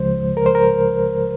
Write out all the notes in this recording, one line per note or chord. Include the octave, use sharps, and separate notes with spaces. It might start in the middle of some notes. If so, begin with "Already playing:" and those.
Already playing: C#2 C#3 F3 G#3 C5
A#4
C5
A#4